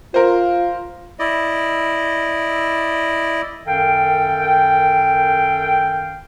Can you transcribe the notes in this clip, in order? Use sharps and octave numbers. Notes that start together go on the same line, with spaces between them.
F4 A#4 C5
E4 D5 D#5
F#2 D#3 A4 F5 G5